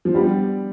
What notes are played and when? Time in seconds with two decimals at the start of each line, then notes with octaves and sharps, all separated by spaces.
0.05 F3
0.14 G3 B3 D4 G4